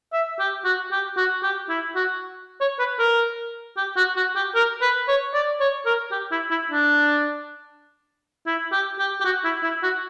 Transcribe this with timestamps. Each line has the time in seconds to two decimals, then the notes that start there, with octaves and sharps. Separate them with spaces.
0.13 E5
0.39 G4
0.65 F#4
0.92 G4
1.17 F#4
1.43 G4
1.69 E4
1.95 F#4
2.61 C#5
2.79 B4
2.99 A#4
3.77 G4
3.97 F#4
4.16 F#4
4.36 G4
4.55 A#4
4.82 B4
5.08 C#5
5.34 D5
5.60 C#5
5.86 A#4
6.11 G4
6.32 E4
6.51 E4
6.71 D4
8.47 E4
8.72 G4
8.99 G4
9.20 G4
9.25 F#4
9.44 E4
9.63 E4
9.83 F#4